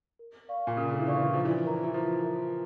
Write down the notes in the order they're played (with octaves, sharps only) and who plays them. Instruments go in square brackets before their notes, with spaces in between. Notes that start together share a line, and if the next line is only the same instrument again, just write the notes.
[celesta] A#4
D5 F5 C#6
[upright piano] A#2
[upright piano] C#3 [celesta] A#4
[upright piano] D3
E3
[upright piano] D3 [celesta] D5 F5 C#6
[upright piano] E3
[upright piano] F3 [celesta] F4
[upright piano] E3
[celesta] A#4 E5 A#5
[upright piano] E3
[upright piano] F3 [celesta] F4
[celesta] A#4 E5 A#5